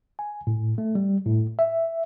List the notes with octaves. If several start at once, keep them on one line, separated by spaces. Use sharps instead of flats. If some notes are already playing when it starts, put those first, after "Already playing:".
G#5
A2
A3
G3
A2
E5